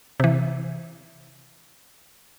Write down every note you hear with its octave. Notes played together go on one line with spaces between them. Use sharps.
C3 E3